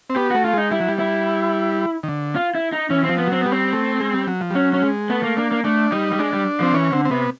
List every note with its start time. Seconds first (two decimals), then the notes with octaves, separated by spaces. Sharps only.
0.10 C4
0.16 B3 G4
0.31 A3 F#4
0.45 F4
0.53 G#3 D#4
0.71 G3 E4
0.80 F#3
0.88 G3
0.99 E4
2.03 D#3
2.09 D3
2.35 F4
2.55 E4
2.72 D#4
2.90 E3 C#4
3.04 C4
3.09 F3
3.18 B3
3.27 F#3 C4
3.41 G3 B3
3.52 C4
3.73 A3
4.00 G#3
4.14 G3
4.27 F#3
4.41 F3
4.50 G3
4.55 F#3 C#4
4.73 C#4
4.82 G#3
5.10 A3 B3
5.23 A#3
5.37 A#3 D4
5.51 A#3
5.65 A3 D4
5.92 G3 D#4
6.12 G3
6.19 G#3 D4
6.33 G3
6.60 F3 C4
6.74 E3 C#4
6.92 D3 C4
7.05 C4
7.11 C3 B3